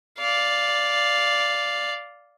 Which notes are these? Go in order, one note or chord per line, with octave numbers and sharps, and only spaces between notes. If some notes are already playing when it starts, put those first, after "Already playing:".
D5 F5